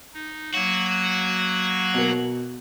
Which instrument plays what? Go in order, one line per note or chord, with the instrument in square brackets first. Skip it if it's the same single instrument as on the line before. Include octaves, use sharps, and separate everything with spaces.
[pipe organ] D#4
[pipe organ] F#3 A#3 [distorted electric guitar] F#4
[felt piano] B2 A#4